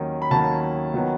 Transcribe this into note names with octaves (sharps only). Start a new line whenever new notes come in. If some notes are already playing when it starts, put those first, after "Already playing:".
Already playing: D#2 D#3 F#3 C#4
B5
D#2 D#3 F#3 C#4 A5
D#3 F#3 B3